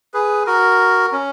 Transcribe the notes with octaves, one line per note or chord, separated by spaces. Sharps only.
G#4 B4
F#4 A#4
C#4